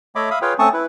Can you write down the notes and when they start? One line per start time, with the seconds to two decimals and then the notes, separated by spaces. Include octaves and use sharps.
0.15 A3 C#5 D#5 E5 B5 D6
0.30 E5 F5 B5 D#6
0.42 F4 G#4 B4 C#5 F5 G5
0.59 A3 C4 C#4 A5 C#6 D#6
0.73 E4 B4